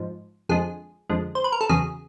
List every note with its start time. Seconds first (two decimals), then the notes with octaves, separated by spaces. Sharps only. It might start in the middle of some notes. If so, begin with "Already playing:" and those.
Already playing: G#2 F3
0.49 F2 D3 F3 G#3 G#4
1.10 F2 D3 F3 G#3
1.35 C5
1.44 B4
1.52 A#4
1.61 A4
1.69 E2 C#3 F#3 G#4